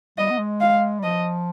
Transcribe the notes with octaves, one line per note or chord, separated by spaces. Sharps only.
G3 D#5
B3
G#3
F5
G3
F3 D#5